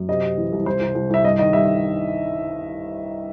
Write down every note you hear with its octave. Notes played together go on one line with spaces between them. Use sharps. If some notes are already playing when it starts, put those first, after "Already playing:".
Already playing: F#2
C3 D#5
C3
E3
C2
C2 C5
C2
C2
C2 E5
G2 D#5
D#3 D#5
G2 E5